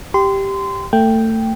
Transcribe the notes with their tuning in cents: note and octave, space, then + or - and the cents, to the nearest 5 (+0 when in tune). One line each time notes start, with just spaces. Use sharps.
G4 +0 C6 -25
A3 +25 G5 +0